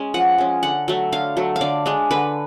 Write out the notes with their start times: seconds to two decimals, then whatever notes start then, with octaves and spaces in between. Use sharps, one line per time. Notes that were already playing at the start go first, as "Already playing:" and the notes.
Already playing: G#3 C#4
0.14 F3 F#5
0.38 G#3 C#4
0.63 D3 F#5
0.88 F#3 A3
1.12 D3 F5
1.37 F#3 A3
1.56 F5
1.61 D3 D5
1.86 G#3 D4
2.11 D3 B4